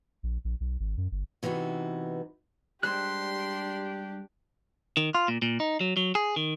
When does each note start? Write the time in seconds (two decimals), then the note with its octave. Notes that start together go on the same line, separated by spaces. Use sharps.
0.23 A#1
0.45 A#1
0.60 B1
0.80 G#1
0.97 F#2
1.12 G1
1.43 C3 E3 B3 D#4 F#4
2.83 G3 G#3 D4 G4 C5 C6 F#6
4.97 D#3
5.15 F4
5.28 A#2
5.42 A#2
5.60 D#4
5.81 F#3
5.97 F#3
6.15 G#4
6.36 D#3